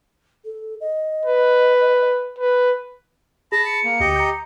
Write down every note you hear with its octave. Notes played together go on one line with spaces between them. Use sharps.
A4
D#5
B4
B4
G#4 A5 B5 A#6
C#7
A#3
D2 G4 D#5
A#5 G6